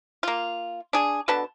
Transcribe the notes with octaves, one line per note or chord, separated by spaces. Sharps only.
A#3 F4
D4 G#4
B2 D3 B4 A5